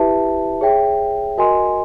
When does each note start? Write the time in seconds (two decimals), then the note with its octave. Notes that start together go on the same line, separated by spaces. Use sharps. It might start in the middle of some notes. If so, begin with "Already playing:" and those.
Already playing: E4 G4 B4 E5 A5
0.61 G#4 C#5 E5 G5
1.38 F#4 A#4 D#5 G#5 C6